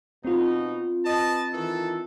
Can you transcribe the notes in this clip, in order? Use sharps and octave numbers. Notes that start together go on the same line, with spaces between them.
B2 C4 D#4 F4
B4 D#5 A5
D#3 E3 A4